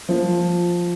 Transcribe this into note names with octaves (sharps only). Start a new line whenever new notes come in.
F3